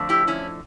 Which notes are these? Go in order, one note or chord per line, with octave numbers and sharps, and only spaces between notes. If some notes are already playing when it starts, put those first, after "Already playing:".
Already playing: F2 D3 F3 A3
E4 G4
C#4 E4